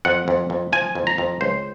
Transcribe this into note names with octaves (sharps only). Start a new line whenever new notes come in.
F2 F#5
F2
F2
F3 G#5
F2
A#5
F2
C#2 C5